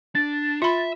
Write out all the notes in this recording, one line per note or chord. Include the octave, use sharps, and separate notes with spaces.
D4 A6
F4 E5 B5